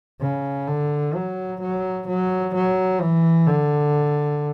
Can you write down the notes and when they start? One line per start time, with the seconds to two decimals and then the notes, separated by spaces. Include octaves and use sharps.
0.20 C#3
0.68 D3
1.15 F#3
1.60 F#3
2.07 F#3
2.54 F#3
3.00 E3
3.47 D3